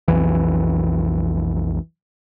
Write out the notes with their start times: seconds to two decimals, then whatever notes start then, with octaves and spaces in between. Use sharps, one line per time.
0.08 B1 F2 E3